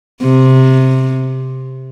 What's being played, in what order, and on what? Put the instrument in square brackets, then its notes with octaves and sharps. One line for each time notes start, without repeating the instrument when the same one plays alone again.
[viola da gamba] C3